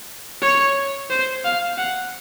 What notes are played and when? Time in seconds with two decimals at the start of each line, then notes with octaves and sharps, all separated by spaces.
0.42 C#5
1.10 C5
1.44 F5
1.78 F#5